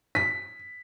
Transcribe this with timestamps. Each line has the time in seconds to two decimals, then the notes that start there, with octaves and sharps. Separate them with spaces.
0.15 B6